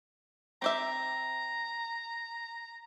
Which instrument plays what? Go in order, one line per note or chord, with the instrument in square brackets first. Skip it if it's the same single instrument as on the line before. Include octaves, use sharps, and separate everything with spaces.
[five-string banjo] C4 G4 E5 [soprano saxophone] A#5